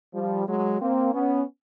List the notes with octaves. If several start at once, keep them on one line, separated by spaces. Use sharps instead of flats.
F3 G3
F#3 G#3
A#3 C4
B3 C#4